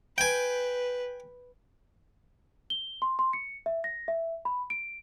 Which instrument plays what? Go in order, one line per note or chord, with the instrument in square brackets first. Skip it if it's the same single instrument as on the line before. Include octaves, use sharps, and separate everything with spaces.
[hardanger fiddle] B4 [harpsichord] G5 G#5
[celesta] G7
C6
C6
C#7
E5
A#6
E5
B5
D7